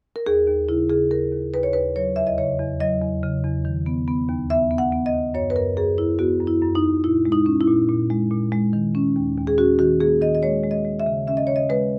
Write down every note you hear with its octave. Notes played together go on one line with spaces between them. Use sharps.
A#4
D#2 G#4
D#2
C#3 E4
C#3 G#4
D#2 A#4
D#2
D#2 B4
C#5
D#2 B4
F#3 C#5
E2 E5
D#5
C#3 C#5
E2
F#3 D#5
E2
C#3
E2
D#3
B3
B3
D#2
B3 E5
B3
F#5
B3
D#5
D#2
F#2 C#5
B4
F#2 A#4
F#2 G#4
F#2 E4
B3 F#4
F#2
E4
F#2
D#4
F#2
A#2 E4
G#3
D#4
C#4
E4
A#2
A#2
G#3
A#2
G#3
D#3
C#4
D#2
D#2
G#4
C#4 F#4
D#3 F#4
A#3 G#4
D#3 D#5
D#5
G#3 C#5
G#3
D#5
G#3
E5
C#3
C#4 E5
D#5
C#3 C#5
D#5
G#3 B4